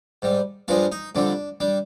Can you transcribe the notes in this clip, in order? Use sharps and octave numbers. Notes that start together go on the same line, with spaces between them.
G#2 G3
G2 F3 G#3 D4 F4
D#4
F2 D3 G3 D4
G3 D4